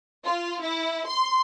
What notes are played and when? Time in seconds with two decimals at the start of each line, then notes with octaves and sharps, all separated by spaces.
0.25 F4
0.62 E4
1.09 C6